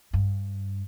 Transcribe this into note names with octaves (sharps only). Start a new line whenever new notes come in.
G2